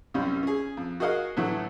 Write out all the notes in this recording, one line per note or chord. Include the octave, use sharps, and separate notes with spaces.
C2 F#2 G3 C4 C#4
C#4 G#4
F2
F#4 G#4 A#4 D#5 F5 F#5
A2 D3 E3 F#3 A3 E4